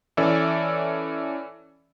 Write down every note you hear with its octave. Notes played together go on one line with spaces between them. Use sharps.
E3 C#4 A4 D5 E5